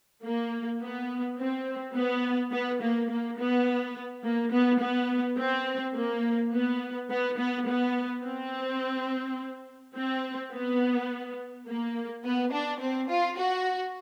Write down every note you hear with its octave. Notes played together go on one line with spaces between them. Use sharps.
A#3
B3
C4
B3
B3
A#3
A#3
B3
A#3
B3
B3
C4
A#3
B3
B3
B3
B3
C4
C4
B3
A#3
B3
D4
C4
F4
F#4